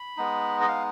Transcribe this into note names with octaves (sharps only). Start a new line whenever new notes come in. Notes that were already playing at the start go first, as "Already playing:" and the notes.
Already playing: B5
G#3 B3 D#4
D#5
F5